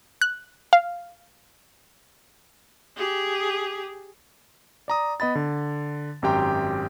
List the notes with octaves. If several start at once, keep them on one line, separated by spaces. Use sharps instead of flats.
F#6
F5
G4 G#4
D5 A#5 D#6
B3 D#5 B5 A6
D3
G#1 F#2 G4 G5 A#5 C6